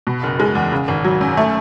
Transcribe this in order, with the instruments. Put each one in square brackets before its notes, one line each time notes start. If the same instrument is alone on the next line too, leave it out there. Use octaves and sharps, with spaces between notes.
[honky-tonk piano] B2
F#1
G#3
E2
C#3
G#1
F#3
F#2
A3